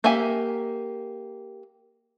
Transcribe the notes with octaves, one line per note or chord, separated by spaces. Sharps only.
A#3 G4 E5 F#5 G#5